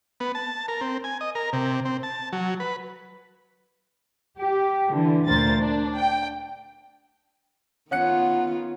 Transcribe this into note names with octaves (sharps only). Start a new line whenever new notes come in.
B3
A5
A#4
C4
G#5
D#5
A#4
C3
C4
A5
F#3
B4
G4
D3 E3
D2 A#2 A#4 C5 A6
D4
G5
D#3 B3 C#4 F4 F#5 F#6 C#7